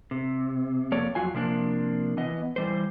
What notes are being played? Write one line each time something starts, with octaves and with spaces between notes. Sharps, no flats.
C3
F2 A#3 C#5 D5
F2 F#3 F4 G#5
C3 F3 A#3 D4
E3 B3 D#5
E3 G3 C5